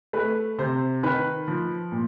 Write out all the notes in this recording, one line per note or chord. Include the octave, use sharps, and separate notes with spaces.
A3 B4
C3 C5
D#3 B4
F3
A#2